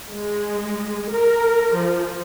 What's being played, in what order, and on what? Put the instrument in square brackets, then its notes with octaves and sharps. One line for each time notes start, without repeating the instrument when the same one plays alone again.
[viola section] G#3
A#4
F3